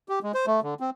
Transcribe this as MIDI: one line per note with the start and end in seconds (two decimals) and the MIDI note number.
0.09 0.19 67
0.23 0.32 56
0.34 0.46 72
0.47 0.60 57
0.63 0.74 50
0.80 0.90 60